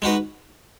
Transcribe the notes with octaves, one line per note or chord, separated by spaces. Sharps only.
G#3 D#4 F#4 B4